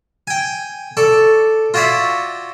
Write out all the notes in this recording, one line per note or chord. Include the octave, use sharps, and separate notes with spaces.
G5 G#5
A4 D5 C#6
F4 F#4 C#5 D5 E5 F5